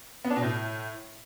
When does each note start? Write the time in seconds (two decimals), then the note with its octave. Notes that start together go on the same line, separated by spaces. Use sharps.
0.25 B3
0.30 D4
0.36 B2
0.42 A2